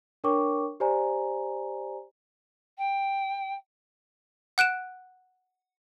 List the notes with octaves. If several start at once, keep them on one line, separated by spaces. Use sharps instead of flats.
D4 A#4 C#5 G5 C#6 D6
G4 C5 D5 G#5 A#5
G5
F#5 F#6 D7 E7